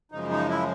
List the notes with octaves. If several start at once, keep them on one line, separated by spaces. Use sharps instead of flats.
F#2 C#3 F3 G#3 D#4
D#4
E4